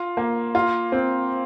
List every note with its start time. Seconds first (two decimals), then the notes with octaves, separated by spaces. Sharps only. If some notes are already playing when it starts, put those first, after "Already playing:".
Already playing: F4
0.17 A#3
0.55 F4
0.92 C4